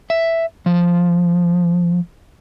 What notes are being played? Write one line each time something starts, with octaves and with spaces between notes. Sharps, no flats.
E5
F3